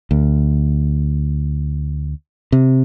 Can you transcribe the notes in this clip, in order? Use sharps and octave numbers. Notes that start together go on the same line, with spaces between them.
D2
C3